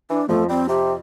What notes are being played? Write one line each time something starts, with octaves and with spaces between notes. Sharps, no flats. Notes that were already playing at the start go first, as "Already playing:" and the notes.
E3 D4
F2 F3 A3
G3 C4
C3 G4